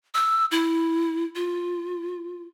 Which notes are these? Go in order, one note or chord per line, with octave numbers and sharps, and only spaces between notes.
E6
E4
F4